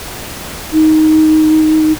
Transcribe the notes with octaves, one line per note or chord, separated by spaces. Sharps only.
D#4